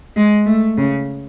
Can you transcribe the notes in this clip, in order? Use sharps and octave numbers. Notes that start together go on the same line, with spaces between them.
G#3
A3
C#3